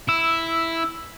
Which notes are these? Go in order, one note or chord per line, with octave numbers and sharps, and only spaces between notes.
E4 E6